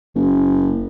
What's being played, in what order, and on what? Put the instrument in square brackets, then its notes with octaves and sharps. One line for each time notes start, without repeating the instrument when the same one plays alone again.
[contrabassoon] F#1